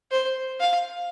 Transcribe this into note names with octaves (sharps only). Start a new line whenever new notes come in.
C5
F5